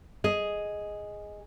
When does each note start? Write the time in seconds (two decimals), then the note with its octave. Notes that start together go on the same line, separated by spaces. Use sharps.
0.24 G#4 D#5